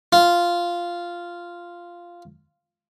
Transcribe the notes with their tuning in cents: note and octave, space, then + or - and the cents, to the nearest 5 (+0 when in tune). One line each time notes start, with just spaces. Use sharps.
F4 -5